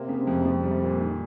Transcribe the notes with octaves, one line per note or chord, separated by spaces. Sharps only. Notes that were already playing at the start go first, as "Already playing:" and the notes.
Already playing: C3 A#3
C#3
F2
F2
C3 G3
A#2
D#3